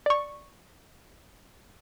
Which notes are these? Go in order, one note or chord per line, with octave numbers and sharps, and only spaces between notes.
D5 C#6